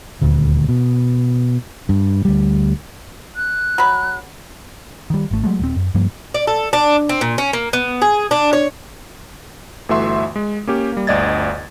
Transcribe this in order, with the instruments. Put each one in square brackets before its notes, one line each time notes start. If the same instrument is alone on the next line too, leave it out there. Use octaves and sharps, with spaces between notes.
[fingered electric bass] D#1 D2
B2
G2
D2 G3
[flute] F#6
[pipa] F#3 B5
[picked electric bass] D#3 G3
G#1 A3
F#3 G#3 A3
D#1 C4
F#2
G2 F3 G3 A#3
[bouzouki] D5
A4
D4
C4
A#2
C#4
A#3
B3
G#4
D4
C#5
[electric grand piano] G1 E3 A3 F#4 E5 C6
G#3
A#3 C#4 G4
G3 A#3
G1 D2 D5 D#5 G#6 A6